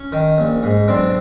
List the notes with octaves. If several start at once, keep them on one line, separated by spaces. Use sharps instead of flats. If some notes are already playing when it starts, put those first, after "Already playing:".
Already playing: C#4
D#3
A#1
G#2
B1 C4 D4